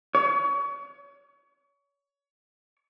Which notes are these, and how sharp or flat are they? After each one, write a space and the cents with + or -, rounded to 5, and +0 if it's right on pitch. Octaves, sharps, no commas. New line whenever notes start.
C#5 +30